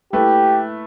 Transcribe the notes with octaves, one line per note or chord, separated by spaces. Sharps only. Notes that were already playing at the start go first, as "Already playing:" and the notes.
A3 E4 G4 B4